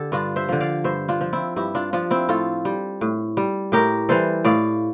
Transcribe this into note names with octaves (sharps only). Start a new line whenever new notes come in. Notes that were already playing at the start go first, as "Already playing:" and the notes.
Already playing: D3 G4 A4
G2 D4 F4
C5 E5
D3 F3
D5 F5
G2 C5 E5
D4 F4
F3
C4 E4
G2 E4 G4
D4 F4
F3 D4 F4
C4 E4
A2 F4 A4
G3
A2
G3
A2 G4 A#4
E3 G3 A4 C5
A2 D5 F5